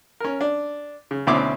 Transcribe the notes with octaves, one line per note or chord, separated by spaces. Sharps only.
C#4 A#4
D4
C#3
D2 B2 C4 C#4 E4 D6